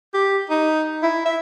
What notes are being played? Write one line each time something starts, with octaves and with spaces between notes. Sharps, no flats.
G4
D#4
E4
E5